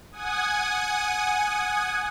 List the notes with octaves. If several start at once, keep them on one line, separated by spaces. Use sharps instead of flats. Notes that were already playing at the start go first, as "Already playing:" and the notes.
F#5 G#5 D#6